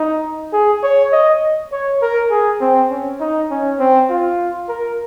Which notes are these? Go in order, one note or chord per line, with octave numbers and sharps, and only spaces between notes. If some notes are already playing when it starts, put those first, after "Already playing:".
Already playing: D#4
G#4
C#5
D#5
C#5
A#4
G#4
C4
C#4
D#4
C#4
C4
F4
A#4